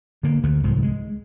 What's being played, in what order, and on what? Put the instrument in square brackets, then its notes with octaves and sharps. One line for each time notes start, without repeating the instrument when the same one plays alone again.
[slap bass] D3 A#3
D2 D3 A3
C2 G#2 F3
G#3